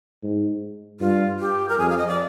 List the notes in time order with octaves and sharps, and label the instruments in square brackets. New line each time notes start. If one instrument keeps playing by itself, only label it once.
[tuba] G#2
[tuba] G2 [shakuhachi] F4
[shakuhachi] G4
A#4
[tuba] F2 [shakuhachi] G#4
[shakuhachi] F5
D#5
D5